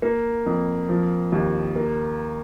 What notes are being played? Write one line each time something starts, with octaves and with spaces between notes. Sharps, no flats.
A#3
F2
F3
D#2
A#3